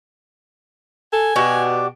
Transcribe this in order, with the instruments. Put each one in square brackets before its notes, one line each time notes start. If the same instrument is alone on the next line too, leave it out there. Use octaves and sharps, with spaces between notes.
[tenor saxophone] A4 [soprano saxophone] G#5
[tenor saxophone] B2 [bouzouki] D4 F#4 G4